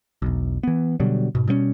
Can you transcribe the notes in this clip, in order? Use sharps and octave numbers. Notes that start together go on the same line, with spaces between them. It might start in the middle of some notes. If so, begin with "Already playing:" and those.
E1 B1
E3 B3
B2 D3 F#3 G3
G#2 B2
B2 G3 A3 C#4